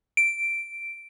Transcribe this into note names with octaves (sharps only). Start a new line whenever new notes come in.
D7